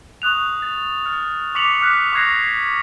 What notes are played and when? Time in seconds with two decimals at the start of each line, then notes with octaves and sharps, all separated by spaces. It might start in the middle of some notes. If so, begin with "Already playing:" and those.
0.22 C#6 D#6 F#6 F7
0.62 A6
1.06 F6 A6
1.55 C#6 D6 B6 C#7 F7 F#7
1.81 D6 F6 F#6 B6
2.13 C#6 D6 F#6 G#6 A#6 C7